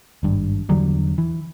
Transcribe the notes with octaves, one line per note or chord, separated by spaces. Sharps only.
G#1 G2
E2 D3 F#3 G3
E3